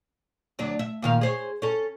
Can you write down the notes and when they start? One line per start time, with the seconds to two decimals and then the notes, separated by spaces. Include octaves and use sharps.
0.59 D2 F#3 D4
0.79 E5
1.02 A#2 D#3 F5
1.21 G#4 C5 C#5
1.62 C#4 A4